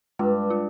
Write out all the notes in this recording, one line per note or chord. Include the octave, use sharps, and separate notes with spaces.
G2 G#3
F4